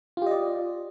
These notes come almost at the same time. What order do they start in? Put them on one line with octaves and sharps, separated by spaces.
F4 G4 D#5 D5